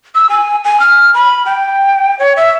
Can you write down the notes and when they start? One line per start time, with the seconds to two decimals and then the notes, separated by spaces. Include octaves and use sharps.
0.15 E6
0.29 G#5
0.64 G#5
0.80 F6
1.14 B5
1.46 G5
2.19 C#5
2.36 E5